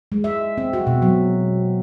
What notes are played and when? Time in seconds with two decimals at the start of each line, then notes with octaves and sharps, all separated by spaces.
0.12 G#3
0.24 E5
0.58 C4
0.73 F#4
0.87 B2
1.02 F#3